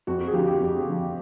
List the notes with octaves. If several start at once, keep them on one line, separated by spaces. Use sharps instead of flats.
F2 F#4
F#4
G#4
D3 F3 G4
G4
F2
D3 F3